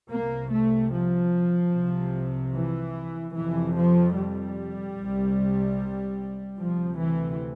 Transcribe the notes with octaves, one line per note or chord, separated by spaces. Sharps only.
C2 C3 A#3
A3
F3
C2 C3
E3
F2 C3 E3
F3
G3
C2 C3
D2 C3 F3
E3